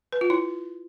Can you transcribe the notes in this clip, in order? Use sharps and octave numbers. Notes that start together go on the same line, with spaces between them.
B4
F4
E4